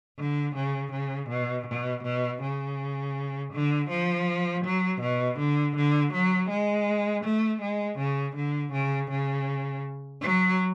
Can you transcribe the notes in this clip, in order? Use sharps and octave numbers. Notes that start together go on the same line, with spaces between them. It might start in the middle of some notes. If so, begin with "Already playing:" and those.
D3
C#3
C#3
B2
B2
B2
C#3
D3
F3
F#3
B2
D3
D3
F#3
G#3
A3
G#3
C#3
D3
C#3
C#3
F#3